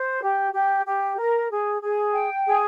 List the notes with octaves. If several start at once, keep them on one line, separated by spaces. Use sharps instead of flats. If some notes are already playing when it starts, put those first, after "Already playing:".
Already playing: C5
G4
G4
G4
A#4
G#4
G#4
G5
G#4